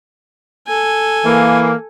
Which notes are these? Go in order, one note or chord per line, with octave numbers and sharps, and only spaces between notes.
A4 G#5
E3 A#3